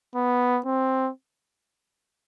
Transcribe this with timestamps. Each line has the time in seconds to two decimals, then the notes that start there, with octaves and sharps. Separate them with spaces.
0.15 B3
0.65 C4